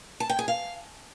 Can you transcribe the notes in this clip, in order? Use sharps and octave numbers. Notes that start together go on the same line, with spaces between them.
A5
G5
G#4
F5